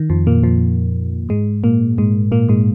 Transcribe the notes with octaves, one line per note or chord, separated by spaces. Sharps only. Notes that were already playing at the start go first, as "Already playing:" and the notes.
Already playing: D#3
F2 F3
A#2 A#3
F2 F3
G#2 G#3
A#2 A#3
G#2 G#3
A#2 A#3
G#2 G#3